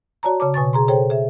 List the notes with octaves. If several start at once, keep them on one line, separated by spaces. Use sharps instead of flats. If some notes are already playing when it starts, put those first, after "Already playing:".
F#4 C#5 D5 A5 A#5
C#3 C#5 A5 D6
B2 G#5 C#6 A6
G#4 A#5 C6
G#4 A4 C5 C#5 G5
G#4 E5